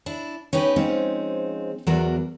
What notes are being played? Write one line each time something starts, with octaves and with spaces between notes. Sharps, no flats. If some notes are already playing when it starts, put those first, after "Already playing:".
D4 E4
C#4 D#4 G4 B4
F3 G#3 C4 C#4 D#4
E2 F#3 F#4 A#4 D5